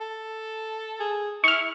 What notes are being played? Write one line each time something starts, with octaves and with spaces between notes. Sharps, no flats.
A4
G#4
E4 C#6 F6